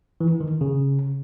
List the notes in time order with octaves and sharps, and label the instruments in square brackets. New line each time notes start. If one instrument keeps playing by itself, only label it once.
[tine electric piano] E3
D#3
C#3